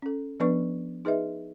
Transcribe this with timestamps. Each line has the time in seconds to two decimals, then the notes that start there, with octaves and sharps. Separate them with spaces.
0.02 C#4 A4
0.40 F3 B3 D4 B4 D5 C#6
1.05 D#4 G#4 B4 D#5 E5